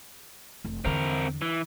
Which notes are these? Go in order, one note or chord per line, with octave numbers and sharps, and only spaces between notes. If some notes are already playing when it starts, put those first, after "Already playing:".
F1
E2 D3 C4 A#4
E3